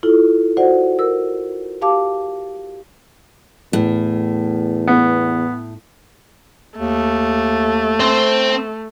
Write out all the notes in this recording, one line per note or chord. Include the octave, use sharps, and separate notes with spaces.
E4 F4 A4
F#4 C5 D5 F#5
A#4 E6
G4 F5 A5 D6
E2 A2
B3
D#2 A3
C4 C5